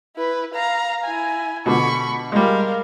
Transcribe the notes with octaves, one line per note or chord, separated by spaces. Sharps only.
E4 B4
F5 A#5
E4 G#5
B2 D3 B5 C#6
G3 G#3 A#4 F5